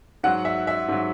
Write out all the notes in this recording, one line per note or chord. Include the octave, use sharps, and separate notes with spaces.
G#2 F#3 F#5
E5
E5
G#2 F#3